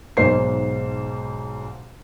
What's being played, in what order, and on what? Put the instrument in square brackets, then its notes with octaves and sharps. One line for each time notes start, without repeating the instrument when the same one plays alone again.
[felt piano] B1 G#2 C5 C7